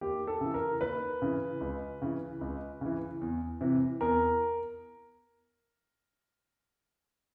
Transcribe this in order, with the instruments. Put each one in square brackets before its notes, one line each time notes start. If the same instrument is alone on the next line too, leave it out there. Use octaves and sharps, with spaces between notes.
[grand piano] D#2 G4
A4
C#3 E3
A#4
D#2 B4
C#3 E3
C#2
C#3 E3
C#2
C#3 E3
E2
C3 E3
E2 A#4